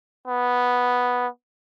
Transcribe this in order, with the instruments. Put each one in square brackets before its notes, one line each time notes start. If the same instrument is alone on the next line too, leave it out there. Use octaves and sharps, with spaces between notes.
[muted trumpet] B3